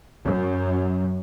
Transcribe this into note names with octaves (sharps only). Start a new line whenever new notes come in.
F#2